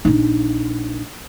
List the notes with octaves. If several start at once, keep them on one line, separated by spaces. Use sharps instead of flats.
A#1 D#4